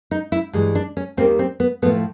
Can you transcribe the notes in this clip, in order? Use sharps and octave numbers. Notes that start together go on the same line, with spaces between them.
D#4
E4
G2 E3 G#3
D4
C#4
D#2 D#3 G3 A#3 C4
C4
B3
A2 F3 A3 B3